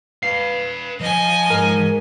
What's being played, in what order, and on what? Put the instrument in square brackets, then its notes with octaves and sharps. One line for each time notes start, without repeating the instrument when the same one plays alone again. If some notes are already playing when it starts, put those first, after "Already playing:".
[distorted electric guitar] B4 F5 [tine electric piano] C7
[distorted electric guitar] F3 C5 [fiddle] D#5 G#5
[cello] G#2 [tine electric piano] A#4